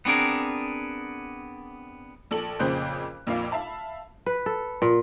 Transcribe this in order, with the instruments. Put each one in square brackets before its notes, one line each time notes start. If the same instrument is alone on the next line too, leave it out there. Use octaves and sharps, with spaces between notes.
[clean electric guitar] B3 C4 D4 G#4 A#4
[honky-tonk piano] A#1 A4 F#7
F2 A#2 C#3 C5 G5 F#6
A#1 F2 A#2 F5
E5 F5 A5 B5
[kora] B4
A4
A#2